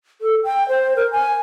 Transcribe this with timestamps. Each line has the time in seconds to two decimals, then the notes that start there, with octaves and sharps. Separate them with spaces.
0.21 A4
0.44 G5
0.68 C5
0.96 A#4
1.12 G#5